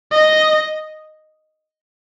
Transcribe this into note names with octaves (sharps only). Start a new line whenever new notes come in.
D#5